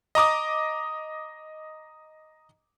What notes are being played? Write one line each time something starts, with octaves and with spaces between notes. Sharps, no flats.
D#5 A#5 D6 D#6